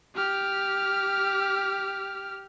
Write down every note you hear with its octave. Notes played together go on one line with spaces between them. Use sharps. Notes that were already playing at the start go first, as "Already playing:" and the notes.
G4 F6